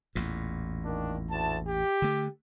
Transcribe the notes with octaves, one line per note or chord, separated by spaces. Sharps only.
A1 E2 A#2
D#3 A#3 D4
D2 E4 A5
G4
D3 A3